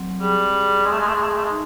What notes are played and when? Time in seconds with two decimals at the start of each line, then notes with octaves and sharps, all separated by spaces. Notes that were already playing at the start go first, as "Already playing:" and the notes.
Already playing: F#3 C4
0.20 G3 G#4
0.52 G#4
0.84 G#3 G#4
0.91 A3
0.99 G#3
1.07 A3
1.14 G#3
1.17 G#4
1.22 A3
1.28 G#3
1.36 A3
1.43 G#3
1.50 D#4